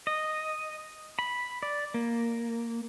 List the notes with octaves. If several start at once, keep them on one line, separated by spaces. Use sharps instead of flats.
D#5
B5
D5
A#3